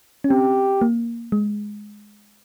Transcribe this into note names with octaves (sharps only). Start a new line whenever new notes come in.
C#4
C4 G4
A#3
G#3